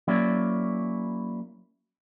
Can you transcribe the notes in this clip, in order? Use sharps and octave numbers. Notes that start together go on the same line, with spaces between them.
F#3 A#3 C#4 E4 D5